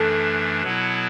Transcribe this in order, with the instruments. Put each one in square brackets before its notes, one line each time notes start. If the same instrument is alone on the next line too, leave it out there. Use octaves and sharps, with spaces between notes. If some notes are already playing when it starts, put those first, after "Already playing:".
Already playing: [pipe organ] F#2 E3 A3 D4 [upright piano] A4
[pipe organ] B2 F#3 B3 E4